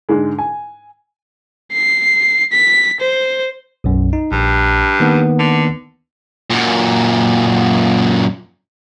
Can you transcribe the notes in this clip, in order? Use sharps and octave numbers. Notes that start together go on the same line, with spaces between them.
G#2 D3 G#3
G#5
C7
B6
C5
B1 F#2
D#4
A#1 G2
D#3 A#3 B3
D3
F#2 A#2